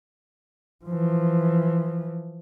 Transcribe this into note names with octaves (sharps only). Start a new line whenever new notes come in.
E3 F3